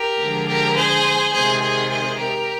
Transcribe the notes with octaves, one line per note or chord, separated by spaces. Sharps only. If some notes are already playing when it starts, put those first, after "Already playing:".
Already playing: G4 A#4
D3 F3 G#3
G4 A#4
G#4 C5
C3 D#3 G#3 G#4 C5
G#4 C5
G#4 C5
G4 A#4